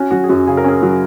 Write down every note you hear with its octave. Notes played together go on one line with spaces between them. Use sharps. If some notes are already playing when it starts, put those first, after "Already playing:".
Already playing: C#4 F#4
F#3 F#4
G#4
F#2 F#4
C#3 G#4
A#4
C#4 G#4
F#3